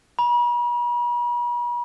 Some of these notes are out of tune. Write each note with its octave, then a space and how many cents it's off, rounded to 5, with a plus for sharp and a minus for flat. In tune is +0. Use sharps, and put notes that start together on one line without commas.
B5 -45